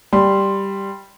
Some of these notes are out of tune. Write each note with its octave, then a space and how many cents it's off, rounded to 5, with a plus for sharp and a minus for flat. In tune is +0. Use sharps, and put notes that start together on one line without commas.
G3 +0 C6 +0